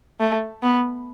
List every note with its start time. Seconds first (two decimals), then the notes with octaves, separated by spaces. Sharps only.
0.20 A3
0.63 B3